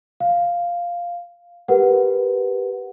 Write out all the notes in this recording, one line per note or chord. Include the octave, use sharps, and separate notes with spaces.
F5
G4 A#4 B4 F#5